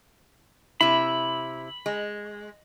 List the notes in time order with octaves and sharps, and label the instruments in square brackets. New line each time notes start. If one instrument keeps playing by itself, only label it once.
[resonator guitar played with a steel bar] C3 E4 [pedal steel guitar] B5
[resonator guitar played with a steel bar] G#3